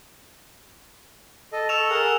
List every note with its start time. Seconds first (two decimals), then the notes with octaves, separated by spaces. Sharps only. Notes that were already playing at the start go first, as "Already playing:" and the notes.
1.53 A4 D#5
1.69 A4 C#6 E6 E7 F7
1.90 G#4 A#4 F#5